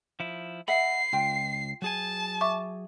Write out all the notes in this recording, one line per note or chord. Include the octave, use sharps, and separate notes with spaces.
F3 E4
D#5 E5 F#5 B5 C7
C#2 F4 G5
F#3 G#4 G#5 A5
E5 C#6 D6